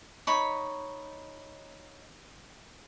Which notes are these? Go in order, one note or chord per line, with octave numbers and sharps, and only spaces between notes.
D#4 C#5 B5 C#6